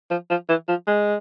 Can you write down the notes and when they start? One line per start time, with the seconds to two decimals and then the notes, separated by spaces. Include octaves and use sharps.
0.11 F3
0.30 F3
0.49 E3
0.69 F3
0.87 G#3